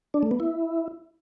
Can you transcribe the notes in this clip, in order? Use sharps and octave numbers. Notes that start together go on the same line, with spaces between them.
D4
A3
B3
E4